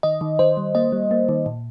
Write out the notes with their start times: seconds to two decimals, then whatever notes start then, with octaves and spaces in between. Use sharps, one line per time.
0.03 D#3 D#5
0.21 D#3
0.39 D#3 C5
0.57 G3
0.75 A#3 D#5
0.92 G3
1.11 A#3
1.29 D#3
1.46 A#2